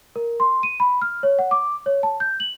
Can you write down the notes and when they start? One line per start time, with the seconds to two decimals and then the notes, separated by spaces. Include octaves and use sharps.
0.16 A#4
0.40 C6
0.63 D#7
0.80 B5
1.02 F6
1.23 C#5
1.39 F#5
1.51 D6
1.86 C#5
2.03 A5
2.20 G6
2.40 F#7